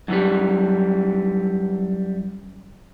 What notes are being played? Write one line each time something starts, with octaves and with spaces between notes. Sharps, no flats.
F#2 E3 G3